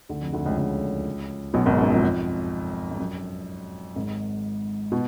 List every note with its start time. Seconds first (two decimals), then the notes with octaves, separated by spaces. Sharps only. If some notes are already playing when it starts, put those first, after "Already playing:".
0.09 D2 D3
0.22 F2 F3
0.33 D2 D3
0.46 C#2 C#3
0.57 C#2 C#3
1.54 B1 B2
1.66 G#1 G#2
1.78 F#2
1.90 F2
2.91 G#2
2.99 F#2
3.96 G#1 G#2
4.92 B2